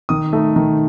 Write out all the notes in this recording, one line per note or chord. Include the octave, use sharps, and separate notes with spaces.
D#3 D#6
A3 D#4
D#3